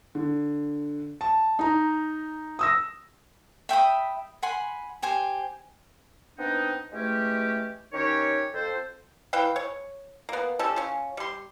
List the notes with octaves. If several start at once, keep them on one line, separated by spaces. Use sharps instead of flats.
D3
A5
D#4 A#5
D#6 E6 A#6
E5 G5 B5 D#6
F#5 G#5 B5 C6
G4 C5 G#5
B3 C4 D4 D#4
E3 G#3 A3 C#4 G4
D#3 C#4 D#4 G4 C#5
F2 A4 C5
E3 B4 F5 G5
C#5
A#3 B3
G3 C#4 A4
C#4 F4
G3 C6